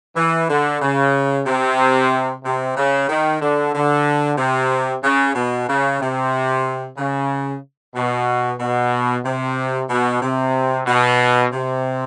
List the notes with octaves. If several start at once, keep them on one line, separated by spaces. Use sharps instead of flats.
E3
D3
C#3
C3
C3
C#3
D#3
D3
D3
C3
C#3
B2
C#3
C3
C#3
B2
B2
C3
B2
C3
B2
C3